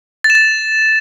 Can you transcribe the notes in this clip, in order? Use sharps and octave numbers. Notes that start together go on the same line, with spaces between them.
A6
E7
A6